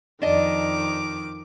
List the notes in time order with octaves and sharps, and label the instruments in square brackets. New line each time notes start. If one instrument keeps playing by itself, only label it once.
[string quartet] F2 D#3 D6 [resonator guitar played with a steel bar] D4 D#5